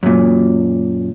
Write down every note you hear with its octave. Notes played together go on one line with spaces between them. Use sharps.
F#2 A#2